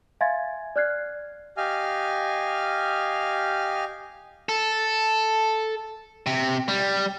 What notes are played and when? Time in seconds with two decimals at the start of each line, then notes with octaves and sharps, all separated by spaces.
0.21 E5 F5 G#5 C6 G#6 A6
0.76 D5 F6 F#6 G#6 C7
1.57 G4 D#5 F5 G#5 F6
4.49 A4
6.26 C3
6.69 G3